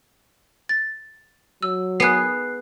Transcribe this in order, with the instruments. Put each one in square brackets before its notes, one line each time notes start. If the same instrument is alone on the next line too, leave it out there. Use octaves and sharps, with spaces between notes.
[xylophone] A6
[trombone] F#3 [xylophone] E6
[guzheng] B3 G#4 [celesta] F#6 C7